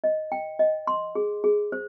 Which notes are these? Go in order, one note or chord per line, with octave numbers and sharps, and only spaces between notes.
D#5
G5
D#5
C6
G#4
G#4
C5